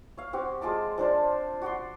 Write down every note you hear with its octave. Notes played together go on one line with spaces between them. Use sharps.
C#5 F5
C4 F#4 G4
G#3 F4 D5 A5
F3 D4 C5 A5
F#4 D5 F#5 C6